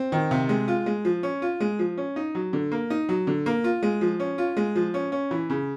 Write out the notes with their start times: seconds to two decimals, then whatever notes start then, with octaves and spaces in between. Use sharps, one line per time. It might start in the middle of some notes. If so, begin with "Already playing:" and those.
Already playing: C4
0.12 D#3
0.31 C3
0.49 G#3
0.68 F4
0.86 G#3
1.05 F3
1.23 C#4
1.42 F4
1.60 G#3
1.79 F3
1.98 C#4
2.16 D#4
2.35 F#3
2.53 D3
2.72 A#3
2.90 D#4
3.09 F#3
3.27 D3
3.46 A#3
3.64 F4
3.83 G#3
4.01 F3
4.20 C#4
4.38 F4
4.57 G#3
4.76 F3
4.94 C#4
5.12 C#4
5.31 E3
5.50 C#3